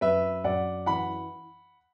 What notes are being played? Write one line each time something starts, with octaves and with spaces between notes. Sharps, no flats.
F#2 B4 E5
F#2 D5 F#5
E3 F#5 B5